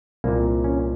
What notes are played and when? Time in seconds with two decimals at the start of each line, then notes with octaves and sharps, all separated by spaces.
0.24 C2 A#2 A#3
0.64 C#4